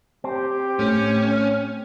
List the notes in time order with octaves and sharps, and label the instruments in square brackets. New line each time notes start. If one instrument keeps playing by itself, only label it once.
[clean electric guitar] C4 [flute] G4
[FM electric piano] A2 A3 [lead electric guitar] C#4